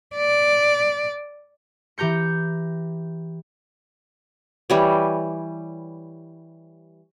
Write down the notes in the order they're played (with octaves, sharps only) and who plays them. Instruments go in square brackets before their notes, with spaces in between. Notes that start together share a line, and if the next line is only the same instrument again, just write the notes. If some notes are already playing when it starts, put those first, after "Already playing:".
[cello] D5
[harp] E3 G4 A#5 G6 C#7
[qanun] E3 G3 C#5